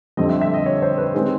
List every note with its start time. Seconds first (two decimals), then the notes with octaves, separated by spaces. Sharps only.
0.17 F2 D3 G3 C4 D#5
0.30 E5
0.41 E5
0.54 D#5
0.66 C#5
0.82 C5
0.98 B4
1.14 D#3 G#3 C4 G#4